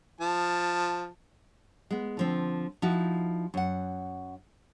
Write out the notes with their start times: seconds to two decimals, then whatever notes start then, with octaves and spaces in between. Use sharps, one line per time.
0.21 F3 A5
1.91 G#3 B3
2.17 D3 F3 C4
2.82 F3 D#4 E4 F#4
3.54 F#2 F#5